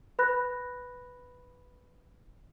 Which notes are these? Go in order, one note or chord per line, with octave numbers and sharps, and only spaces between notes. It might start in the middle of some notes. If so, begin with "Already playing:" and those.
B4 B5 F#6 A#6